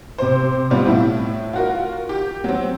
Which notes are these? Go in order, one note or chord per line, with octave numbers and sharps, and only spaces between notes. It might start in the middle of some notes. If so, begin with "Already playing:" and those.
C3 C5
B2 G3 C4 F4
A2 E4
F4 F#4 A#4
G4
F#3 C4